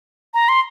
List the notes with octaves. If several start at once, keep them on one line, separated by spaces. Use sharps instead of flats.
A#5
C6